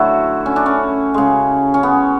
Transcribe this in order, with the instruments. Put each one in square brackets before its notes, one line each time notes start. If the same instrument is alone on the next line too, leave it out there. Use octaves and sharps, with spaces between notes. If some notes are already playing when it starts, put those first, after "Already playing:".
Already playing: [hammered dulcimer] D3 F#3 A3 E4 F#4
C#4
D4
C#4
C#3 G#3
C#4
B3